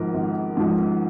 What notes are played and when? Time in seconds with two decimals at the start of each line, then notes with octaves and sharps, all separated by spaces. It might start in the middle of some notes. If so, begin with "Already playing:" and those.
Already playing: G#1 G#2 F3 A#4
0.14 G#1
0.57 G#2 F3